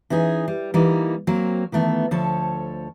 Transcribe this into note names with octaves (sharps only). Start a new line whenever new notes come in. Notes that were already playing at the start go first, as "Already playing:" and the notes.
E3 C#4 D#4 G#4
G3
E3 G3 A#3 D#4
F#3 A#3 C4
D#3 E3 A3 B3
D2 F3 A4 C#5 A5